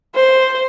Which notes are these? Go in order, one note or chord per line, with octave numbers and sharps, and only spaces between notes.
C5